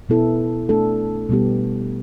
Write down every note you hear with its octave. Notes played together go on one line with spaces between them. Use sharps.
B2 B3 E4 A4
A3 D4 A4
B2 G3 B3 G4